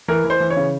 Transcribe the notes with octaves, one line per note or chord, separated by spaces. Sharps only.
E3 A#4
E3
C5
E3
C#5
C#3